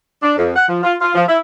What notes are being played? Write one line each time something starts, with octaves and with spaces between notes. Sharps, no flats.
D4
F2
F#5
F3
F4
F4
F3
E4